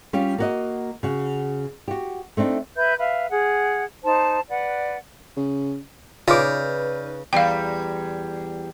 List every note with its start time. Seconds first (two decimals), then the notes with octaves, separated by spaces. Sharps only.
0.13 G3 C#4 F4 G4
0.38 A#3 F#4 D#5
1.03 C#3 F#4
1.88 F#4 G4
2.37 A3 C4 D4 D#4
2.75 B4 E5 G6
2.98 B4 E5 F5
3.29 G#4 F#5
4.04 D#4 C5 A5
4.49 B4 D5 F#5
5.37 C#3
6.28 C#3 D#4 F4 B4 D5 D6 F6 G6
7.33 E2 G3 F5 G5